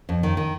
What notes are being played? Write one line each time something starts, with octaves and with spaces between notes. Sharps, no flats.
F2
D#3
D#3